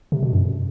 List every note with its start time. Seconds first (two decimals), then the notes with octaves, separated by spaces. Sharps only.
0.12 C3
0.23 B2
0.33 F#2